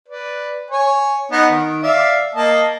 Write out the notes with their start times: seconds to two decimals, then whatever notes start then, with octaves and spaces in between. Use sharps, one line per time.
0.09 B4 D5
0.71 C#5 G#5
1.32 B3 D#4
1.51 D#3
1.83 D5 E5 F5
2.35 A#3 D#5 A5